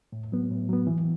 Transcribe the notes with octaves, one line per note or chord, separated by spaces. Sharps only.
A2
F#3 B3
A2
F#3 B3
E3